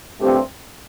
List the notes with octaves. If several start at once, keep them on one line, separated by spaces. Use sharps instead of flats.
G2 F3 A3 C4 G4